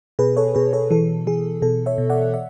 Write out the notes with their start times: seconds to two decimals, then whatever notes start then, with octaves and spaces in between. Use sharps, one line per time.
0.19 B2 G#4 B4
0.37 A4 C#5
0.55 B2 G#4 B4
0.73 A4 C#5
0.91 E3 A4
1.27 E3 G#4
1.62 B2 A4
1.86 C#5 E5
1.98 B2
2.10 D5 F#5
2.34 E5